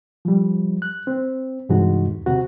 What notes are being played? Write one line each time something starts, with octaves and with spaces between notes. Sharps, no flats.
F3 G3
F#6
C4
G2 C3 E3 G#3 D#4 F#4
D#2
C3 C4 F#4